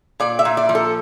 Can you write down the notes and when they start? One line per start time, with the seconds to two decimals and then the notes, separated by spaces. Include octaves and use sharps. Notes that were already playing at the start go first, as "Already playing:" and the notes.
0.20 A#2 D5
0.39 E5
0.45 A#2
0.57 D5
0.69 F3
0.75 A4